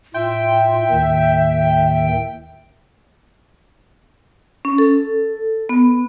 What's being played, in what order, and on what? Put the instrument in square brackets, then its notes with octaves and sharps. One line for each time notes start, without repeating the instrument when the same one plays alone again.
[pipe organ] A2 F4 [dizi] E5 [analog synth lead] G5
[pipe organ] D#2 A2 D#3
[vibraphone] C#4
A4
B3